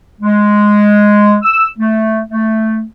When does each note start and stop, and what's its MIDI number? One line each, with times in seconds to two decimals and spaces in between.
0.21 1.36 56
1.42 1.67 88
1.78 2.20 57
2.31 2.82 57